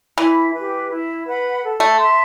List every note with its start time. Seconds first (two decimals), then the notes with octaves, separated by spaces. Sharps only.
0.17 E3 E4
0.53 B4
0.59 G4
0.90 E4
1.26 B4 F#5 B5
1.62 A4
1.80 A3
1.99 E5 A5 C6